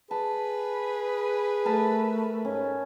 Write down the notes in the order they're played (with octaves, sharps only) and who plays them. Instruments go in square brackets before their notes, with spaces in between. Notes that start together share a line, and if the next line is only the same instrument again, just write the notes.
[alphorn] G#4 [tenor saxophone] B4 [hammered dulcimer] A5
[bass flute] A3 [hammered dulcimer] A#4 A5
[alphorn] G#2 [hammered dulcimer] C#4